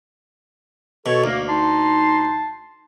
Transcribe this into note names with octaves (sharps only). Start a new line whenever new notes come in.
B2 A4 C#5
D2 A#3
D#4 A5 C6